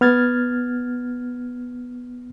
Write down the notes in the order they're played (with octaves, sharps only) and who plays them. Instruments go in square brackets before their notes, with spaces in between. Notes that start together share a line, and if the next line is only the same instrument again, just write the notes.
[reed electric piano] B3 F6 G#6 A6